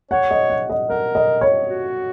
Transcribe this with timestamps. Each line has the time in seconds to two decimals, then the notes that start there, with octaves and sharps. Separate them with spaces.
0.11 C#5 F#5
0.31 D#5
0.50 F#5
0.70 D#5
0.89 A#4 F#5
1.15 D#5
1.41 C#5
1.68 F#4